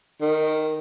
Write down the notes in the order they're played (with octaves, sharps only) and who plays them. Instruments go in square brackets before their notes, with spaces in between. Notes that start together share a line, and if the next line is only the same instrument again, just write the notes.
[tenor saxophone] D#3